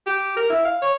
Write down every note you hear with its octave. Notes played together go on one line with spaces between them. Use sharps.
G4
A#4
E4
F5
C#5